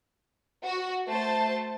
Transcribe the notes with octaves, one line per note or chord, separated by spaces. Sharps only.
F#4
A3 C5 A5